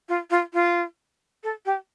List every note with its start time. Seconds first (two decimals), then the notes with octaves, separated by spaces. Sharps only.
0.09 F4
0.30 F4
0.54 F4
1.43 A4
1.66 G4